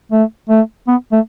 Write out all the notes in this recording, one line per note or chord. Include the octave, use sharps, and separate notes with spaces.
A3
A3
B3
A3